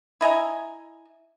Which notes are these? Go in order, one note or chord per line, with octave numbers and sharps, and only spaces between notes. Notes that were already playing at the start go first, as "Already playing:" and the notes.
E4 D#5 G#5 A#5